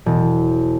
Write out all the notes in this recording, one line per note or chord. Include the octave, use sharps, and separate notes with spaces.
E1